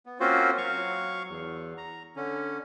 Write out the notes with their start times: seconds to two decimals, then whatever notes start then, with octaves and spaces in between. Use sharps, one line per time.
0.06 B3
0.20 A#3 C4 C#4 F4 F#4 C5
0.58 F#3 F5 C#6
1.29 E2
1.78 A#5
2.16 D3 C#4